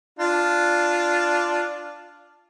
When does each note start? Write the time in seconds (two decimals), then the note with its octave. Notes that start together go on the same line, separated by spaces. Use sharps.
0.19 D4 F4